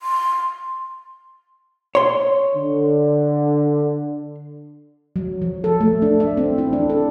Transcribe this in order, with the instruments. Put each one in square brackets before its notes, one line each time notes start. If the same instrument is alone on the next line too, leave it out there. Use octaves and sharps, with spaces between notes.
[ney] C6
[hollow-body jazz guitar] C#5 C6
[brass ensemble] D3
[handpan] F#3
F3
A4
A3
D4
E5
C4
E4
D4
A4